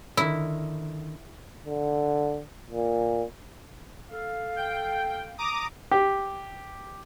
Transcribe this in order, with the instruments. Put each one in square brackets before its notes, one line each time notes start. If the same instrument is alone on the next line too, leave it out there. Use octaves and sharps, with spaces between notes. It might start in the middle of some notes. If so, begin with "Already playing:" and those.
[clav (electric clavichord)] D3 D#3 [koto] E4
[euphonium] D3
A#2
[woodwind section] A4 F5
[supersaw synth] G5
A#5 D6 D#6
[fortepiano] G4